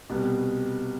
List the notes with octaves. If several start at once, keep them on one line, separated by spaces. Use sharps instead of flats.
C2 B2 G3 B3